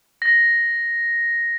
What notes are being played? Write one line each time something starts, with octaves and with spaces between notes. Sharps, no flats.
A#6